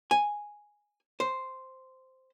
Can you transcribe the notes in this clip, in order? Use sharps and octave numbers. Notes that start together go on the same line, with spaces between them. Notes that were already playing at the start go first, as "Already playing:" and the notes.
G#5
C5